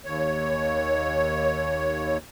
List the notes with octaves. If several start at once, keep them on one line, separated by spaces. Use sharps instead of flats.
D#2 C#5